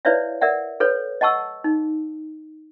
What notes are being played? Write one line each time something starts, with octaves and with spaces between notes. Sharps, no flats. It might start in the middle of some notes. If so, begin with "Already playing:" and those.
E4 B4 C#5 D5 E5 F5
A#4 D5 E5 F#5
A4 B4 C#5
D#5 F#5 A5 C#6 E6
D#4